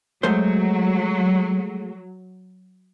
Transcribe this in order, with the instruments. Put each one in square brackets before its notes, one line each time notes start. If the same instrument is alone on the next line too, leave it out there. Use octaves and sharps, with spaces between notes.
[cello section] F#3 [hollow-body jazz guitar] G#3 A3 C5